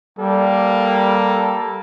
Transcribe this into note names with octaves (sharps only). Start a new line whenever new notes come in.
G3 A#3 A4